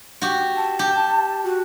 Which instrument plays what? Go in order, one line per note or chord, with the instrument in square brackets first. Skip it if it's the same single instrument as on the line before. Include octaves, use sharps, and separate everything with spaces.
[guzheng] F#4 G4
[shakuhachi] A5
[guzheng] G4
[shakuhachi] F#4